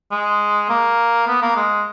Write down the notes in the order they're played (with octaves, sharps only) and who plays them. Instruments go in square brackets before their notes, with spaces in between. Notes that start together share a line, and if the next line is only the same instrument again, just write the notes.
[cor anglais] G#3
A#3
B3
A#3
G#3